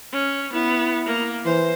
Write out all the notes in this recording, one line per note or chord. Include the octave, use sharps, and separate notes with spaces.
C#4
B3 E4
A#3
E3 C5